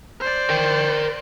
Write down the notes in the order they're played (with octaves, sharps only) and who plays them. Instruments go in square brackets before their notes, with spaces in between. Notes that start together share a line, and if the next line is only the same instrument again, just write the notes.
[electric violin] C5 D5
[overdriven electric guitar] A#4 G5